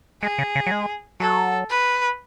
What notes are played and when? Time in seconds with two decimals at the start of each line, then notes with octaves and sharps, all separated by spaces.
0.22 G#3 G#4
0.38 C#3
0.55 C#3
0.67 F#3
0.71 G#3
1.20 F#3 A4
1.70 B4